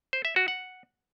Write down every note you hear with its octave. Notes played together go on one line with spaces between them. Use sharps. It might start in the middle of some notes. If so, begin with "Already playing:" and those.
C5
E5
F#4
F#5